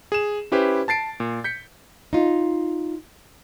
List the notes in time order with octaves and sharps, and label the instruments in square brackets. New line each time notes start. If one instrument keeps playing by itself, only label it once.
[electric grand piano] G#4 E7
C#4 E4 G4 B4 C5
A5 A6 C7 D7
A#2
G6 B6 C#7
[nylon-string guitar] D#4 F4